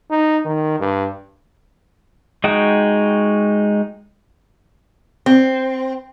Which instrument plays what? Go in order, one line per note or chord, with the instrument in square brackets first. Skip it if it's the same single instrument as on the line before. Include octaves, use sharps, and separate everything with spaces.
[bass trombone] D#4
D#3
G2
[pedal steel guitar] G#3 D#4 F#4 G5 D#6
[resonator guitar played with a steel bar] C4